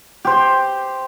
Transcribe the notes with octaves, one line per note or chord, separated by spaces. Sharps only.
G4 C5